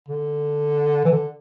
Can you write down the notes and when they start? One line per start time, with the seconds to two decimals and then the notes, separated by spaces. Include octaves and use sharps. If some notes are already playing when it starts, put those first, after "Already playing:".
0.08 D3
1.05 E3
1.12 D3